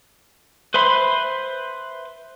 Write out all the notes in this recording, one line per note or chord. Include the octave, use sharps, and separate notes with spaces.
B4 C5 E5 B5 C6